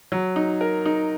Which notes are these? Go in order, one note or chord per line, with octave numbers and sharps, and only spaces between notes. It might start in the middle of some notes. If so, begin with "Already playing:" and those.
F#3
D#4
A#4
D#4